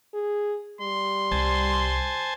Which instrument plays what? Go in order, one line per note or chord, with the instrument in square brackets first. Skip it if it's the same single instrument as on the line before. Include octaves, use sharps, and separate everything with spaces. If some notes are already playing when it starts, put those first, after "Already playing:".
[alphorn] G#4
[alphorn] G3 [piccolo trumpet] C6
[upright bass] C2 [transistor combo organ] C5 G#5 A5